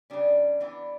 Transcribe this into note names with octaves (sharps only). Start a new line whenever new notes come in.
C#3 G3 C#4 D4
E3 B3 D4